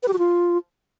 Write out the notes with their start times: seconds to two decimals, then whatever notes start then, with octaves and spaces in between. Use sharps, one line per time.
0.03 B4
0.08 G4
0.13 F#4
0.19 F4